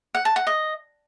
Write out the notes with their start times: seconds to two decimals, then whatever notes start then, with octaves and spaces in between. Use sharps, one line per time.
0.15 F#5
0.25 A5
0.36 F#5
0.47 D#5